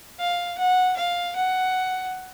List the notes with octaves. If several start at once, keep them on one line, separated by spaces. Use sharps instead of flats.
F5
F#5
F5
F#5